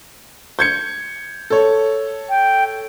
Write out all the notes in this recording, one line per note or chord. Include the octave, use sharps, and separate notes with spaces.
G6 G#6 C#7
A4 C#5
G5